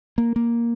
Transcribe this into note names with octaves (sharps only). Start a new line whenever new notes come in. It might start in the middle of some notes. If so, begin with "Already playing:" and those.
A#3
A#3